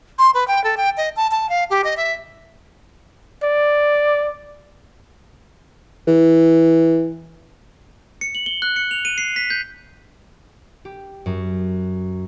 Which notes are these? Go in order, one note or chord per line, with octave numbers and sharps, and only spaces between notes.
C6
B4
G5
A4
G5
D#5
A5
A5
F5
G4
D#5
E5
D5
E3
C#7
F#7
G7
F#6
C#7
F7
D#7
C7
B6
G6
G4
F#2